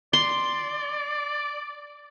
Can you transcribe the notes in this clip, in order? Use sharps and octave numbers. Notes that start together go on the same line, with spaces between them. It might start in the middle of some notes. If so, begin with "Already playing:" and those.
D5 C6